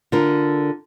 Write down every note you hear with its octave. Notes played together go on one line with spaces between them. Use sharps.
D3 F4 A4 A#4